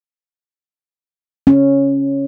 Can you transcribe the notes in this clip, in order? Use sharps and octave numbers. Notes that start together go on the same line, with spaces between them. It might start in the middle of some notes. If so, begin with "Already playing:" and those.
C#4